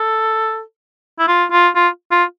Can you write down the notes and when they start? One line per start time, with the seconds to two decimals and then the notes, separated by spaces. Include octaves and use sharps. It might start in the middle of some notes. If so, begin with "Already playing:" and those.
Already playing: A4
1.19 E4
1.28 F4
1.52 F4
1.76 F4
2.11 F4